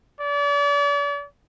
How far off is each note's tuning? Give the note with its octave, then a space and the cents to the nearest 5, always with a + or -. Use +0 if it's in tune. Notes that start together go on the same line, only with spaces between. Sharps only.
D5 -40